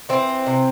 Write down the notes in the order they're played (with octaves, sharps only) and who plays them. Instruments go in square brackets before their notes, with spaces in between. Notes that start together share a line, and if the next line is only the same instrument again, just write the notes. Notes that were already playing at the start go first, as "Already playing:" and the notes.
[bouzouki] E3 C4
C3